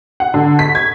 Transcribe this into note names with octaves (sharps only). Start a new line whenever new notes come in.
F#5
D3
B6
G#6